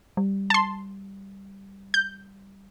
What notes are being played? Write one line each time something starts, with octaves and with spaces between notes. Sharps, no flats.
G3
A5 C6
G6